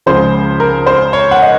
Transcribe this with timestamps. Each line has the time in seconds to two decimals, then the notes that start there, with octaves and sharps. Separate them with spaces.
0.06 C#2 C#3 F3 C5
0.60 A#4
0.86 C5
1.13 C#5
1.31 F#5
1.42 D#5